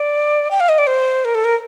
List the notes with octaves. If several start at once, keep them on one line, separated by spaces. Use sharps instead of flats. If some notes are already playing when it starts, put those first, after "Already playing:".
Already playing: D5
G5
F5
D#5
D5
C5
A#4
A4
A#4